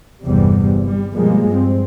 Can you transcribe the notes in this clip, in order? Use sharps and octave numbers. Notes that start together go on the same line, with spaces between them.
G1 E2 C3 G3
G3
B2 F3 G3 G#3 A#3
G2 C4